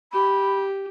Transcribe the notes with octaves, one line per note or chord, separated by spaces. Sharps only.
G4 B5